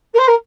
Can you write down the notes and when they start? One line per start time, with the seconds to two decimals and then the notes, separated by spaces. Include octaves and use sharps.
0.14 A#4
0.18 C5
0.27 A#4